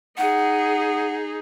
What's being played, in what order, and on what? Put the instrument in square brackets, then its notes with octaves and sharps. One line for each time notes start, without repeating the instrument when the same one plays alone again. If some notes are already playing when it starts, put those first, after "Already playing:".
[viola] D#4 G#4 [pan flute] F#5